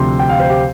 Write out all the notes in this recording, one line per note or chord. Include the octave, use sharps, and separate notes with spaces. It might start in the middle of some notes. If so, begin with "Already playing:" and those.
Already playing: D2 C3 F3 C4 C6
G5
F5
C5
G4